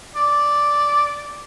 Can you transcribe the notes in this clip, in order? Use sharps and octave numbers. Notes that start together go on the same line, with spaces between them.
D5